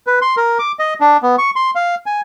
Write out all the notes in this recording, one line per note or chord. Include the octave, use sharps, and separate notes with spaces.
B4
C6
A#4
D6
D#5
D4
B3
C#6
C6
F5
G#5